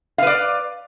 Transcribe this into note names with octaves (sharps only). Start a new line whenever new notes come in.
B4 D5 F5